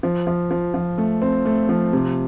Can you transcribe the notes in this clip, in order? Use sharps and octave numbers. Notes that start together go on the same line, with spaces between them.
F3
F3
F3
F3
A3
C4
A3
F3
C3